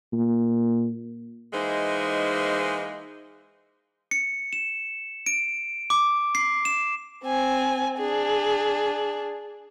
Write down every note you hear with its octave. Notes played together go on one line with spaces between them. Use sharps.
A#2
E3 G#3 A#3 D#4 C5
C#7
E7
D7
D6
C7
E7
C4 G#5
D4 G#4